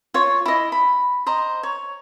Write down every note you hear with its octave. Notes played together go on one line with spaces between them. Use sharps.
F4 C#5
E4 D#5
B5
C5 D#5 A#5
C#5